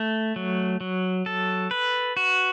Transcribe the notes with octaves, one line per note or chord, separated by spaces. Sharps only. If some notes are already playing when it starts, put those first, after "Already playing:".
Already playing: A3
F#3
F#3
A4
B4
F#4